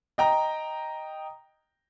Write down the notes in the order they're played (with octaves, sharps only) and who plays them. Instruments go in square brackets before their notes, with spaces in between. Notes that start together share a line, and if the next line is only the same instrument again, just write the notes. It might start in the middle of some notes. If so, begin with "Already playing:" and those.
[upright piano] D#5 G5 A#5